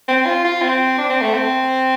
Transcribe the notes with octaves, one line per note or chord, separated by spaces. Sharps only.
C4
F4
F4
C4
D4
C4
A3
C4